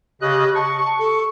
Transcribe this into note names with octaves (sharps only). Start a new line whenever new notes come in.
C#3 G4 D#5 F#6
A5 C#6
A4